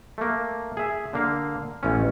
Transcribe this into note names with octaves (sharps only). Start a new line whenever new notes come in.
A3 A#3
G#4 E5
D3 A#3 F5
A1 C#4